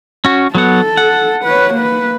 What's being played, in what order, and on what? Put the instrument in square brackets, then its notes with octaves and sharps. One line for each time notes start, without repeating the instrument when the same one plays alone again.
[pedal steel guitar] C#4 F#4
[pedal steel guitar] F#3 B3 F#5 [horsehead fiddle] A4
[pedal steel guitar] F#5
[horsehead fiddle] B4 C#5
A#3 B4